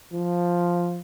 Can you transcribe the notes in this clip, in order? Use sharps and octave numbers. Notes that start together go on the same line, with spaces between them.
F3